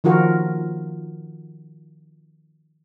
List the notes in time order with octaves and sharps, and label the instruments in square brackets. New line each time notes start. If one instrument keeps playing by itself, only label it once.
[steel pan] D#3 F3 F4 F#4 A#4